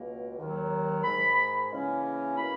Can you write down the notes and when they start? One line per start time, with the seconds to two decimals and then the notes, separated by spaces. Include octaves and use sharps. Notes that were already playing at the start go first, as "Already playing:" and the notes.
Already playing: C#2 B2 A#3
0.37 D#2 D#3 F#3
1.04 G#2 D#3 G#3 B5
1.71 C#3 E3 A#3 C#4
2.37 B2 A#3 E4 B5